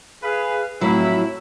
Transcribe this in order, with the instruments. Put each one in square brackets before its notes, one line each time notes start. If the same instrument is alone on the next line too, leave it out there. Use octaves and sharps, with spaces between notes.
[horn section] G#4 B4 F5
[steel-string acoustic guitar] F2 A2 F#3 [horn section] E4